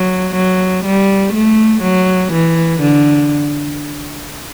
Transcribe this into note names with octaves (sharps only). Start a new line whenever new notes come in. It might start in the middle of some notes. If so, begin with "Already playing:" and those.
Already playing: F#3
F#3
G3
A3
F#3
E3
D3